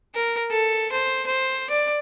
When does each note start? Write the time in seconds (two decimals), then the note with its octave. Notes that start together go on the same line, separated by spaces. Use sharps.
0.14 A#4
0.51 A4
0.92 C5
1.26 C5
1.70 D5